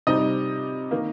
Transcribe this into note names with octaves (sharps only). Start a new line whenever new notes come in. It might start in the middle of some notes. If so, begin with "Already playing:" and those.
C3 G3 C4 D#4 D#5
D#3 A#3